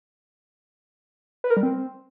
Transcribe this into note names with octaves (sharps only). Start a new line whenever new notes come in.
B4
A#4
G3
C4